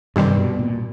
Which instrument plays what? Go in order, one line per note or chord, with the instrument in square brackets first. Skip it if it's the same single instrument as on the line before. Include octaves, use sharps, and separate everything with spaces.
[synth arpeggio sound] G2 D#3 G3 C4 [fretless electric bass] C3
[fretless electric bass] B2
A#2